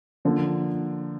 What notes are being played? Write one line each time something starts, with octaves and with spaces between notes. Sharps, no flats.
D3 F3 A#3